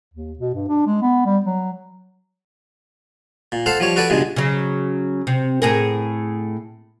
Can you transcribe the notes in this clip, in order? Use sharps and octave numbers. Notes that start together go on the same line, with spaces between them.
D#2
B2
G2
D4
G#3
B3
G3
F#3
A#2
A4 C5 F5 F#5 A5
F3 G3 C#5
F#4 A4 B4 D5
C#2 G2 B2 G#3
C#3 F#3
C3
A2 G#4 A#4